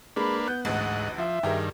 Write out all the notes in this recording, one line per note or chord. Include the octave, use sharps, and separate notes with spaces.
G#3 A#3 D4 B4 B5
B3 F#6 G6
A1 D2 G#2 D#5 F#5
F3 E5
G2 D#3 G4 G#4 A#4